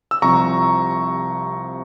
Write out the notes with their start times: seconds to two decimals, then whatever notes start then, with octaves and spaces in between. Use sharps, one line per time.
0.11 E6
0.22 C2 C3 F3 A#5 C#6